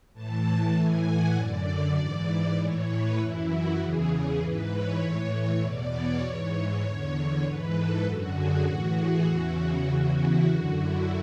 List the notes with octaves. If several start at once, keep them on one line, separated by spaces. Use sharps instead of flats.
A2 E3 A5
A2 E3 G#5
F#5
F#2 D3 D5
G#2 E3
A2 E3 C#5
B4
F#2 E3 E4
F#4
E2 C#3 E3 G#4
G#4
G#2 E3 B4
C#5
A2 E3
E2 B2 D5
C#5
G#2 E3
E2 D3
G#2 E3 B4
A4
F#2 D3 F#4
G#4
A2 E3 F#4
G#4
E2 C#3 E3 F#4
E2 C#3 E3 F#4
E4
F#2 D3 F#4
E4